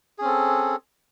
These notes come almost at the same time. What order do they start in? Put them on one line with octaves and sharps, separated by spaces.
G#4 C#4 C4 A4